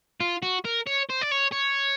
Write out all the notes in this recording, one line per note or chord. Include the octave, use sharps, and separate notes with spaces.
F4
F#4
A#4
C#5
C5
D5
C#5
C#5